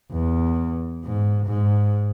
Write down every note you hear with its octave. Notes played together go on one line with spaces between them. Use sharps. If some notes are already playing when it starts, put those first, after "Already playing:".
E2
G#2
G#2